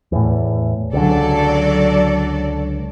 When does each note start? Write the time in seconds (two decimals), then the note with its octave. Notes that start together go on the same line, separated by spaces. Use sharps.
0.12 E2 A2
0.93 C#2 D3 F#3 A4 D5